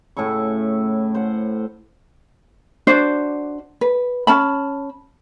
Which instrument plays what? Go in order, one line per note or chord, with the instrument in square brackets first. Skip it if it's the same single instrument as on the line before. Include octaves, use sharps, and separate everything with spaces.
[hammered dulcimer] A2 C#3 E4 C#6
C5 F#5
[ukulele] D4 F#4 C5 D5
B4
C#4 A5 B5